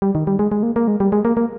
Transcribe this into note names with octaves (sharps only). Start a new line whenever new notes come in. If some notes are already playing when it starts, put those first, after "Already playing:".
G3
D#3
G3
G#3
G#3
A#3
A#3
G#3
G3
G#3
A#3
A#3